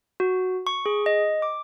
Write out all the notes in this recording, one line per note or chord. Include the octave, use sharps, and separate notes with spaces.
F#4
C#6
G#4
D#5
D6